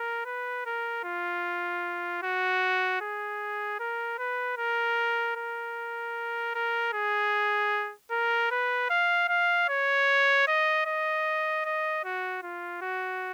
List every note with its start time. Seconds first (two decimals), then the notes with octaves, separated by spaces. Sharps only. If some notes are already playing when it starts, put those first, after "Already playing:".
Already playing: A#4
0.25 B4
0.66 A#4
1.04 F4
2.23 F#4
3.01 G#4
3.80 A#4
4.18 B4
4.57 A#4
5.36 A#4
6.55 A#4
6.93 G#4
8.11 A#4
8.51 B4
8.90 F5
9.28 F5
9.69 C#5
10.47 D#5
10.86 D#5
11.65 D#5
12.05 F#4
12.43 F4
12.82 F#4